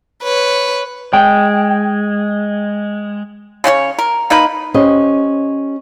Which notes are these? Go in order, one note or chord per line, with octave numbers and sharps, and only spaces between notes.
B4 C#5
G#3 G5
C#3 C#4 F#4 C#5
A#4
A#3 D#4 A#4 B4
C#4 G4 C5 D#5